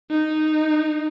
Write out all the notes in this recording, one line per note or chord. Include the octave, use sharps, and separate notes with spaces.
D#4